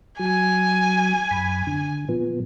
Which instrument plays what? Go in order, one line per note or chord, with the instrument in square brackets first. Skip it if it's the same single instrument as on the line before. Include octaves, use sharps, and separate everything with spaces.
[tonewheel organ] F#3 [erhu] G#5
[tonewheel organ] F#2 B5
D3
A#2 F3 B3